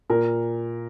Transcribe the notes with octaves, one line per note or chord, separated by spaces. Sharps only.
A#2 A#4